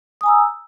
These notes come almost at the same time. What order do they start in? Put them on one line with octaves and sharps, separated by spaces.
D#6 G#5 A#5 E6